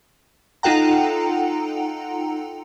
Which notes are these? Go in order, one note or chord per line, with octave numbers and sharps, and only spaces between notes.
D#4 F4 A4 F#5 G5 A#5